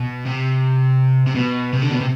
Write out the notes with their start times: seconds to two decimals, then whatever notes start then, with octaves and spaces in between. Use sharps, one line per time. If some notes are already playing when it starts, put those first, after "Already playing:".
Already playing: B2
0.26 C3
1.27 C3
1.35 B2
1.73 C3
1.82 D3
1.91 B2
2.00 C3